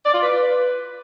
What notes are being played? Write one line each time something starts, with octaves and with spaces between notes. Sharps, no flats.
D5
F4
B4